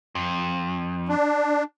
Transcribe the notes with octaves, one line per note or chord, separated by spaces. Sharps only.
F2
D4